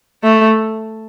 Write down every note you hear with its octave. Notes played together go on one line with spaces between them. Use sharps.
A3